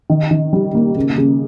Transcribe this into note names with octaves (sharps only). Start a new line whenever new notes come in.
D#3
D#3
G3
A#3
C#3
C#3